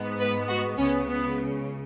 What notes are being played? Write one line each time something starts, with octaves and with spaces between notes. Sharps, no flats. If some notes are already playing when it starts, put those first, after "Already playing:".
Already playing: G#2 G#3 B3
B4
F#4
C#2 C#3 B3 C#4
B3